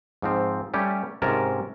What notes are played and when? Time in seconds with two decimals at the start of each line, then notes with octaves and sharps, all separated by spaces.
0.22 G#2 F3 C4
0.74 G3 A3 C#4 G4
1.22 G#2 C3 C#4 A#4 A5